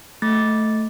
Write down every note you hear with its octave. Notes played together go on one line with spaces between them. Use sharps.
A3 A6